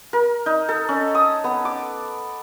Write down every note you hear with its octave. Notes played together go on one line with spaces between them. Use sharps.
A#4
D#4
A4
C#4
D#6
B3
D6